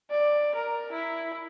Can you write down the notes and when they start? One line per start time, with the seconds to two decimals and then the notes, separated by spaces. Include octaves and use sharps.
0.10 D5
0.55 A#4
0.92 E4